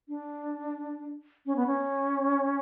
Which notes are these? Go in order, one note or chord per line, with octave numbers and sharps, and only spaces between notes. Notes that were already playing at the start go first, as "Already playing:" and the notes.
D4
C#4
B3
C#4